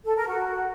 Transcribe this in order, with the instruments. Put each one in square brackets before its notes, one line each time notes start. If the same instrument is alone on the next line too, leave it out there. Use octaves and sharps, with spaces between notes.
[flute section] A4
A#4
F#4